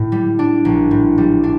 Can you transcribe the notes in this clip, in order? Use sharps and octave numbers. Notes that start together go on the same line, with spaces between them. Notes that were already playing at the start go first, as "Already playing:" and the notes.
Already playing: A2
G3
D4
A#1
A2
G3
D4